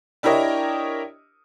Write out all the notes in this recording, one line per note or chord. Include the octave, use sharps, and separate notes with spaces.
D4 E4 G4 A#4 C#5 D#5